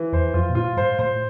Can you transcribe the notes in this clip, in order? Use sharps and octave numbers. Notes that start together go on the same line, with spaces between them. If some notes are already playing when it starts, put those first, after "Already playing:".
Already playing: E3
E2 C5
F2 F4
A#2
A2 F4
G2 C5
A2 C5